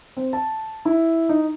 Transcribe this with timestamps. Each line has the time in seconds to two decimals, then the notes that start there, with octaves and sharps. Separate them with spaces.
0.17 C4
0.33 A5
0.85 E4
1.29 D#4